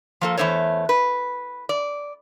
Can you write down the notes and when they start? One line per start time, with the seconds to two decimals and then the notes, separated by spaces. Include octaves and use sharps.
0.21 F3 A#3 A4
0.37 E2 A3 C4 C5 C#5
0.89 B4
1.69 D5